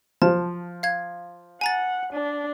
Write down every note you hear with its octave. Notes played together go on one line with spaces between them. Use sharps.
F3 A5
F5 G#6
F#5 G#5 A#5 A6
D4